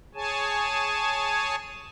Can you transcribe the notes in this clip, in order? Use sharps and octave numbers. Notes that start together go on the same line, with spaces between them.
G#4 C#5 G#5 A5